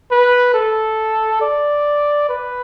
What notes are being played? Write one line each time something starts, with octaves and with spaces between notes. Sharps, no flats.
B4
A4
D5
B4